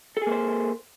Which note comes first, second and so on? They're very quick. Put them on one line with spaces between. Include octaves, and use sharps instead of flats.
A4 G#4 A#3 C5